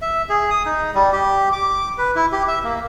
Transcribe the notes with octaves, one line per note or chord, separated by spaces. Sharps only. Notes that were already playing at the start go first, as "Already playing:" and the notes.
E5
G#4
D#6
D#4
G3
G4
D6
B4
E4
G4
E5
A#3